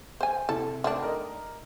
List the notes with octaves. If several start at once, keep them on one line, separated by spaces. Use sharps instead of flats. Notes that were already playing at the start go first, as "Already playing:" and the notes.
C5 G#5
C3 E4 A4
D#3 A3 D4
A#4 D5 D#5